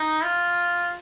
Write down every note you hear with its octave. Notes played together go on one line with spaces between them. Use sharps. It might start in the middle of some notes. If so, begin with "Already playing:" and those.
Already playing: D#4
F4